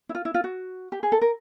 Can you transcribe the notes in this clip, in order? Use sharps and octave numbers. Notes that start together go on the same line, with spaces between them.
E4
F4
E4
F4
F#4
G4
G#4
A4
A#4